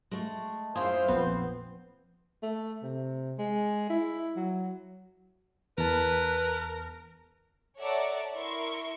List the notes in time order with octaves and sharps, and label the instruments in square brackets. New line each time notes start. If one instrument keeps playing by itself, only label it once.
[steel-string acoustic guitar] G#3 A3
[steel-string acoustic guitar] F#2 E4 F4 [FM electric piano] G#4 [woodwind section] C5
[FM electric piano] A#1 F2 B3 [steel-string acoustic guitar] C4
[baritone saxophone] A3
C3
G#3
E4
F#3
[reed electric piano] E2 A5 [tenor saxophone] A#4 [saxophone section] B4
[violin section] A4 C#5 D5 E5 F#5 A#5
E4 A#4 E5 C6 C#6